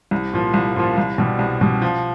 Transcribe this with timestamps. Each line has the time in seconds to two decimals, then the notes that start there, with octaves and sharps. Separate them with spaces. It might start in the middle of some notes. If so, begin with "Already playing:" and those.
0.11 C2
0.33 A#2 F3
0.54 C2
0.76 A#2 F3
0.98 C2
1.18 B2 G3
1.39 C2
1.61 B2 G3
1.82 F3